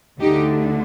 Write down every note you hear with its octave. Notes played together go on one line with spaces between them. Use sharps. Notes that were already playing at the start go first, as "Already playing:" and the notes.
D2 D3 A3 D#4 G4